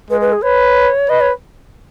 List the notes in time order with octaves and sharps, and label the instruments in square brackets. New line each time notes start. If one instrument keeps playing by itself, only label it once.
[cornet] G#3 [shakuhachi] B4
[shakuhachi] B4
G#4
[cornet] B4 [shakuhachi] C#5
[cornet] B4 [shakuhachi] D#5
[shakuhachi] C#5